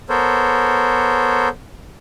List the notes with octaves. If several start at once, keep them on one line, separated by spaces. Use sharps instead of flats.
B3 A4 A#4 C5 C#5